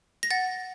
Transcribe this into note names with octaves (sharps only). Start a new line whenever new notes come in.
A#6
F#5 A6